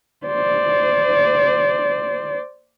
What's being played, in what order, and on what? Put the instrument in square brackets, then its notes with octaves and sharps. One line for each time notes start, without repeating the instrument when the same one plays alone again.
[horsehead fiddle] C5 D5